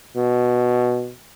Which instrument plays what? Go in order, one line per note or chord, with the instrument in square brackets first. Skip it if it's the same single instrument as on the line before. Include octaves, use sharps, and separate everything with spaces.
[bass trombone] B2